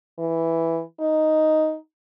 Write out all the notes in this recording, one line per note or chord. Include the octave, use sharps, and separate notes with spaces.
E3
D#4